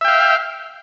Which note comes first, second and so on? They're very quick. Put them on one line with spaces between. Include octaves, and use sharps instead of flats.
E5 G5 F5